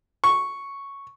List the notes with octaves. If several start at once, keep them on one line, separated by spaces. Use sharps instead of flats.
C#6